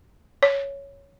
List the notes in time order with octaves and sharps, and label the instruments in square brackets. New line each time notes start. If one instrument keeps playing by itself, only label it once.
[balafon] C#5